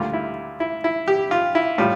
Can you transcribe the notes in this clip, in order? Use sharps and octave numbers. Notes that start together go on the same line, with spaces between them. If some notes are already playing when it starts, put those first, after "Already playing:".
Already playing: D2 D3 G3 A#3 F4
E4
E4
E4
G4
F4
E4
A2 G3 F4